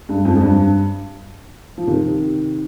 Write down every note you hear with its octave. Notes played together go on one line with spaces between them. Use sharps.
G2
F2 G#2
F2
G2
F3
C3 D#3